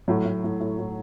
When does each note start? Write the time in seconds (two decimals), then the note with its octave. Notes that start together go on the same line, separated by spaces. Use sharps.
0.08 A2 F#3
0.25 A2
0.44 A2
0.60 A2
0.79 A2